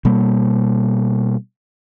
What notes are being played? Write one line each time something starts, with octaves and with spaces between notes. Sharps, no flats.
B2 G3 A#3